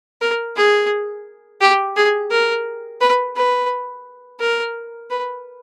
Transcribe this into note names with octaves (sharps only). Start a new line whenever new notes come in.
A#4
G#4
G4
G#4
A#4
B4
B4
A#4
B4